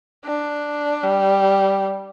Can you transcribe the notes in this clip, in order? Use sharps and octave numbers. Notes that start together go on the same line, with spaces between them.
D4
G3